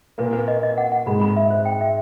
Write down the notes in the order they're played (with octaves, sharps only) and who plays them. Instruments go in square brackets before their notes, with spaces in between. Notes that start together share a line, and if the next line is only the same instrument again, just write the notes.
[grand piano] A#2 A#3 [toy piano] B4
[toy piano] B4
D#5
D#5
F#5
F#5
[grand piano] G#2 G#3 [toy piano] B5
[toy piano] B5
E5
C5
G5
E5